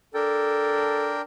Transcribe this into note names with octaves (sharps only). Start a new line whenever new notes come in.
D4 A4 A#4 G5